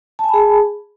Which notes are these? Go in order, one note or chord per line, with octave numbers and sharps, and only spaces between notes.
G#4 G#5 A5 B5